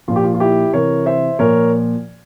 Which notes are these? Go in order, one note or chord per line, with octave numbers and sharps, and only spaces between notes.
A#2 F3 F4
G4
F4
F4
E4 G4
C3 E3 A#4 C#5
C5 E5
A#2 F3 A#4 C#5